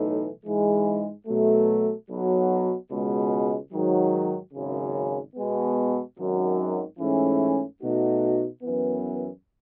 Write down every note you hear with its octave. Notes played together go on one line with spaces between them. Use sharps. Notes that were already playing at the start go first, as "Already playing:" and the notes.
Already playing: B1 A2 E3 A3 D#4
G#2 E3 G#3
B2 F#3 A3
B1 B2 F#3
C#2 B2 G#3
G#2 D#3 F#3
G#1 F#2 C#3
B2 G#3 B3
G#1 F#2 D#3 F#3
G#2 E3 A3 C#4
B2 A3 D#4 F#4
F#2 E3 B3